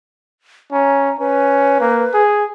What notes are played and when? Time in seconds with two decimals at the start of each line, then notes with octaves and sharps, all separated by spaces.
0.73 C#4 A#5
1.20 C#4 B4
1.81 A#3
2.14 G#4